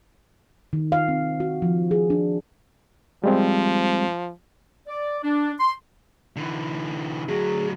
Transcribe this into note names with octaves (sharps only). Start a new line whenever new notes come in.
D#3
F5
C4
F#4
F3
G#4
D4
F3 G3 G#3 C4
D5
D4
C6
D3 E3
D2 F#3 G#4